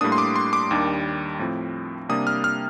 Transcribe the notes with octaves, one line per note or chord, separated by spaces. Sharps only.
A2 G3 A#3 D4 D#6
C6
D6
C6
D6
D#2 D#3 G3 D4
A2 F3 C4
C3 G3 A#3 D4 D#6
F6
F6